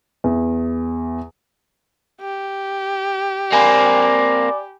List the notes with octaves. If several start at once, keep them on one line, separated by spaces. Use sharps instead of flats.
E2
G4
A#3 C4 D5 G#5 B5